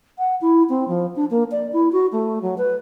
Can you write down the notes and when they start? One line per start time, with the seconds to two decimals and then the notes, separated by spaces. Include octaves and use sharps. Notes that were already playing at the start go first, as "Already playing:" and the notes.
0.19 F#5
0.41 E4
0.69 C4
0.88 F3
1.16 D4
1.31 A#3
1.51 D5
1.73 E4
1.92 F#4
2.12 A3
2.42 F#3
2.58 B4